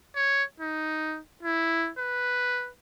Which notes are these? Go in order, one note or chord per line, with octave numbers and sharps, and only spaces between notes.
C#5
D#4
E4
B4